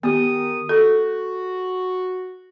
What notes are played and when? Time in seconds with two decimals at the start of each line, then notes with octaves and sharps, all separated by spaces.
0.03 D#3 B3 G4 D#6
0.69 F#4 A4